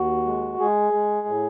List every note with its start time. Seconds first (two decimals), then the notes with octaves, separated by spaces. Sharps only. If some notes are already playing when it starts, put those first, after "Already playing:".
Already playing: D#2 F#4
0.26 G#3
0.59 G#3 G#4
0.93 G#3
1.27 A2